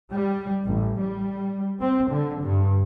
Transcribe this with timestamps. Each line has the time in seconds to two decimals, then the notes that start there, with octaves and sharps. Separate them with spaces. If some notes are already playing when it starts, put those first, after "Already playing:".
0.12 G3
0.67 A1
1.00 G3
1.81 C4
2.10 D3
2.43 G2